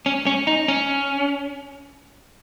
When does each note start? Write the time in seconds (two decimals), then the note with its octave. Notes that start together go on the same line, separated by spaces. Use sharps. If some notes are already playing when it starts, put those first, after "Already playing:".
0.06 C#4
0.27 C#4
0.47 D#4
0.68 C#4